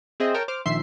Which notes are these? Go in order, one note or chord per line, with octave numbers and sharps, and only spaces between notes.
C4 G#4 C5 D#5 E5
A#4 C#5 G5 A5
C5 D6 F6
A#1 D#3 E5 C6 C7